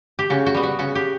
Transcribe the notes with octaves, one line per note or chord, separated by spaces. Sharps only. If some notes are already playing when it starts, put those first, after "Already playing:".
G4
C#3 F#4
F#4
G3 B3
F#4
C#3 F#4
G4